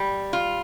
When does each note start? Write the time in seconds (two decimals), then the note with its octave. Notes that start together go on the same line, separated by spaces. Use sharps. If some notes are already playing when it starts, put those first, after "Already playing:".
Already playing: G3
0.33 F4